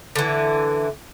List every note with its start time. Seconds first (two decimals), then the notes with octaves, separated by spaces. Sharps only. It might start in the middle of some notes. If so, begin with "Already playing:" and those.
0.16 D3 E3